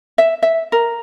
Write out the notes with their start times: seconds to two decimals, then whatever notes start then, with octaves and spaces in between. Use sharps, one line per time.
0.18 E5
0.43 E5
0.72 A#4